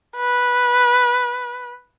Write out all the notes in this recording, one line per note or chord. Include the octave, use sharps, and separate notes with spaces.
B4